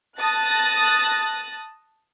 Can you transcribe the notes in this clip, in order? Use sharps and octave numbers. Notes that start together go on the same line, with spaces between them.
A5 D#6 F#6 A6 A#6